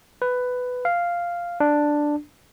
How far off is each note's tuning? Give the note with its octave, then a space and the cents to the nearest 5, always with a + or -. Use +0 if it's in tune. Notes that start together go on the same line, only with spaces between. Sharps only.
B4 +10
F5 -5
D4 +5